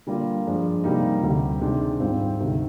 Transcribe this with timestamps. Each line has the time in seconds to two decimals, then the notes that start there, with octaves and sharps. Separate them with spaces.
0.07 D3 G3 A#3 F4
0.46 G2 F3 G#3 D4
0.84 C3 G3 A#3 D#4
1.23 D2 C3 G3
1.61 C3 D#3 G#3 D4
2.00 G#2 D#3 G3 C4 F4
2.39 D2 C3 D#3